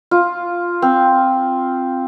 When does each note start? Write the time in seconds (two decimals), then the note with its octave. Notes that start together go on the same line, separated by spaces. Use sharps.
0.11 F4
0.82 C4